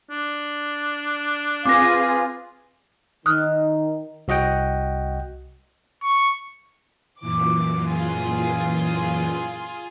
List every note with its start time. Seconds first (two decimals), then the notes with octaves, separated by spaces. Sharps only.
0.10 D4
1.66 C4 F4 G#4 B4 D6 A#6
3.26 D#3 D#6 F6 F#6
4.28 C2 F#4 D#5 F#5 G5
6.03 C#6
7.21 F#2 A#2 E3 D6
7.85 F4 G#4